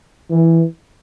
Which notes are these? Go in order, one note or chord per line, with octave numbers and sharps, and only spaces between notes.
E3